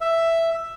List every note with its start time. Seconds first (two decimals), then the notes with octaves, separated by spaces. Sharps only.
0.01 E5